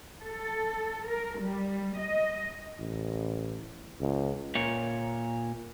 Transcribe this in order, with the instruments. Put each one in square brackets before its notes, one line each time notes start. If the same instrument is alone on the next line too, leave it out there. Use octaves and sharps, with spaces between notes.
[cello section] A4
A#4
G3
D#5
[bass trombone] A1
C#2
[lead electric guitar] A#2 C#5